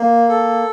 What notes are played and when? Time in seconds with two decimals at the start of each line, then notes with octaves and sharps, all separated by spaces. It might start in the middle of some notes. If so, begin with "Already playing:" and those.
Already playing: A#3
0.29 A4